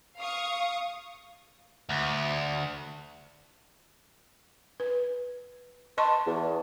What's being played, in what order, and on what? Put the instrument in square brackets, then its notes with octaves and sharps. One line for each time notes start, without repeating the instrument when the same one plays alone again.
[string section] F5 C#6 D#6
[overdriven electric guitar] D2
[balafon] B4
[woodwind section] B4 A5 [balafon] D#5 C6 C#6
[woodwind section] E2